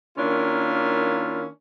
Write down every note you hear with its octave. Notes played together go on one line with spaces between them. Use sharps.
D#3 A#3 C#4 D4 E4 F4